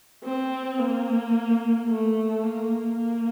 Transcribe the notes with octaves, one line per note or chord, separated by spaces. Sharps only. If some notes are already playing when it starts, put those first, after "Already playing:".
C4
A#3
A3
A#3
A#3